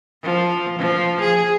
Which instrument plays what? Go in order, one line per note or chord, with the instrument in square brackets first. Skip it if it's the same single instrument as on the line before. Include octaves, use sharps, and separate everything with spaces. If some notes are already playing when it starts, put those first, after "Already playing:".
[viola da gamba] F3
F3
G#4